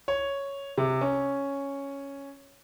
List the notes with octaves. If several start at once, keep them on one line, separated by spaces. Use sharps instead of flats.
C#5
C3
C#4